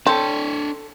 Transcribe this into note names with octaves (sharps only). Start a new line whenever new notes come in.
C4 D4 A4 C#5